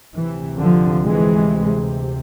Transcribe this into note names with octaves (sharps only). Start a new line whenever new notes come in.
D2 C3 E3
D3 F3
E3 G#3